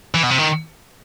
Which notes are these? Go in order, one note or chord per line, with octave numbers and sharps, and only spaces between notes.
E3
B2
C3
D#3